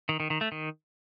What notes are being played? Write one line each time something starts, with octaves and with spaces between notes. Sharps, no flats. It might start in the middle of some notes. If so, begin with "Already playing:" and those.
D#3
D#3
D#3
A3
D#3